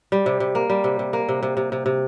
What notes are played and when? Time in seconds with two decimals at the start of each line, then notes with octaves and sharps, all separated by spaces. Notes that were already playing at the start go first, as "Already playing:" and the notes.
0.12 G3
0.26 C3
0.40 C3
0.55 A#3
0.70 G3
0.84 C3
0.99 C3
1.13 A#3
1.29 C3
1.43 C3
1.57 C3
1.72 C3
1.86 C3